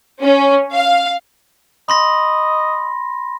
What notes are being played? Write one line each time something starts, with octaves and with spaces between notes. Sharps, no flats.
C#4
F5
D#5 B5 C6 A#6